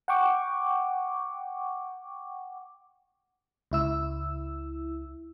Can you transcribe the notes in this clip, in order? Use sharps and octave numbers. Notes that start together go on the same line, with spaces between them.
F#5 G5 C#6 D6
C#2 E4 E6